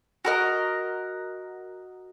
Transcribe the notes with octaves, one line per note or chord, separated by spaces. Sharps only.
F#4 A#4 D#5